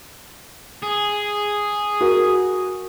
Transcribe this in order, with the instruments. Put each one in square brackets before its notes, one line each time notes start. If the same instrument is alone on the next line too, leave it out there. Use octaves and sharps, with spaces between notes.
[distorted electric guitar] G#4
[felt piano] F#4 A#4